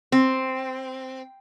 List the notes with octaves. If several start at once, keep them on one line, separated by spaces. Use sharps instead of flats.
C4